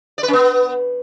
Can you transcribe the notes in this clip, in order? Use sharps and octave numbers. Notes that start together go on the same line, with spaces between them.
D5
B4
C#4
B3